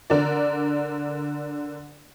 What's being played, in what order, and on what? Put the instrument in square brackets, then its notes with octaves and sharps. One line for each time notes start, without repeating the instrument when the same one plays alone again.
[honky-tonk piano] D3 A#4 D5